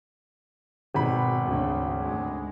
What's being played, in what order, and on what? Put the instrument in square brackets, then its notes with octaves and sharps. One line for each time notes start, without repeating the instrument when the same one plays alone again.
[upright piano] G#1 B5 [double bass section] B2
[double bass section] D2 C#3
D2 G#3